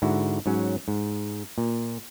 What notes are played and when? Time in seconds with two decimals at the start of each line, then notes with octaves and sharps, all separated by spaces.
0.02 G#2 D3 E4 F#4
0.46 G#2 F#3 C#4
0.88 G#2
1.58 A#2